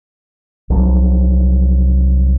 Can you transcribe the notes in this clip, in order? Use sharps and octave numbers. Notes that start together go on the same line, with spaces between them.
C2 F3 F#3